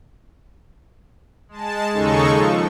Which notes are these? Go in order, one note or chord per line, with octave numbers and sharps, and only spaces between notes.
G#3 A5
D#2 C#3 G#3 D#4 A4 C#6
F3